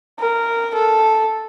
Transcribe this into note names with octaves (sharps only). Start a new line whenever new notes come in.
A#4
A4